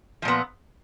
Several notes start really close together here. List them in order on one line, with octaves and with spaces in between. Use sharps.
F3 A#2 B3